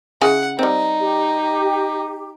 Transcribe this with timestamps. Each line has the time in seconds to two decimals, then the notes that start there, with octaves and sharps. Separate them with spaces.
0.22 C#3 E4 F#5 G#5
0.59 G3 C4 D#4
1.01 G4